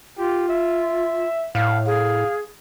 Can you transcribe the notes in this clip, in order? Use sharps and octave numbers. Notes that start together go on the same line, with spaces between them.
F4 G4
E5
A2 F5
G#4 F5